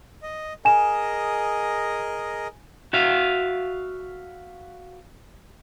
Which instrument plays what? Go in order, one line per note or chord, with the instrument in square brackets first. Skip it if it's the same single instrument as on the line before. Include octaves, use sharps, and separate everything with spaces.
[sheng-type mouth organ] D#5
[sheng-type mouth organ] G#4 A#4 D#5 [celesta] G#5 E7
[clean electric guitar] F#4 E5 F5